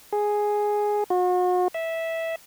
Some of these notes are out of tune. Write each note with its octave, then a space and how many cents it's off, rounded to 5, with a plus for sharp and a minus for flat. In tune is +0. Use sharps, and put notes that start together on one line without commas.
G#4 +0
F#4 -40
E5 -10